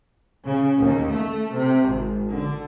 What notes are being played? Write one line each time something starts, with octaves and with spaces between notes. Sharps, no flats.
C#3
D#2
A3
C3
G#1
D3